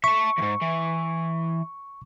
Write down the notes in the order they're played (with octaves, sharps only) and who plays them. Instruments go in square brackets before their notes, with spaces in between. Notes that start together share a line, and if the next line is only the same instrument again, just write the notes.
[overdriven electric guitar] E5 A5 [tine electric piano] C#6
[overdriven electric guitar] E2 G#2
E3